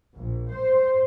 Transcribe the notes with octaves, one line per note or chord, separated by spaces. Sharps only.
A#1
C5